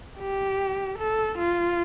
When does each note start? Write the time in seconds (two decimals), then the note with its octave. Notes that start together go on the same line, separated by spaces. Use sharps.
0.19 G4
0.98 A4
1.38 F4